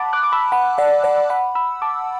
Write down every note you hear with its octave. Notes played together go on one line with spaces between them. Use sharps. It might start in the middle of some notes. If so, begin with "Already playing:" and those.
Already playing: F#5 A5 B5 D6
D6 F#6
D6
B5 E6
F#5 B5
D5 F#5
D5 F#5
F#5 B5
B5 E6
A5 D6